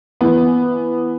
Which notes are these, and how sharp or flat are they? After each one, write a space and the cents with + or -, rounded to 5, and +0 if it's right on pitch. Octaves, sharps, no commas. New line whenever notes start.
E3 +10 B3 +0